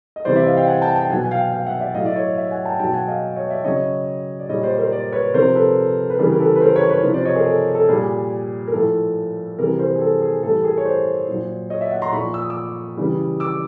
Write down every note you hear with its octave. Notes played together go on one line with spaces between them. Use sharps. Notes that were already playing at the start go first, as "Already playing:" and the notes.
D#5
C3 E3 G3 C5 D5
D5 E5
D#5 F5
F5 G5
F#5 G#5
G5 A5
G5 A5
B2 F#3 F#5 G#5
G#5
F5 G5
F5 G5
E5 F#5
D5 E5
A2 F#3 D#5 F5
D5 E5
C#5 D#5
D5 E5
F#5 G#5
G5 A5
B2 F#3 G5 A5
F#5 G#5
D#5 F5
C#5 D#5
D5 E5
C#3 F#3 C#5 D#5
D5
A#2 G3 C#5 D#5
C5 D5
A#4 C5
C5 D5
B4 C#5
C3 F3 A#4 C5
A4 B4
B4
C#3 E3 G3 G#4 A#4
A#4
A4 B4
B4
A#4 C5
B4 C#5
B4 C#5
C3 F3
C5 D5
C#5 D#5
G#4 A#4
A4
A4
A#2 G3 G#4
A#4
A2 F3 A4
C3 E3 G3 G#4 A#4
A#4 C5
G#4
A4
G#4
A2 E3 G3 A4
G#4 A#4
C#5
C5 D5
A#2 F#3
C#5 D#5
D5 E5
E5 F#5
A#5 C6
A#2 F3 B5 C#6
E6
D#6
D6 E6
C#3 E3 G3
D6 E6